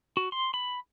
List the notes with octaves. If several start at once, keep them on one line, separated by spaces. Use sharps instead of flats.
F#4
C6
B5